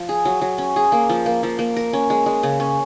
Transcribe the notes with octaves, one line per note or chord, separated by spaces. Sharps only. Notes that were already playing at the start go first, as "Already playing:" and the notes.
Already playing: F3
G#4
F#3
F#3
C#4
G#4
A#3
F3
A#3
F3
A#3
A#4
C#4
G#3
G#3
C#3
C#4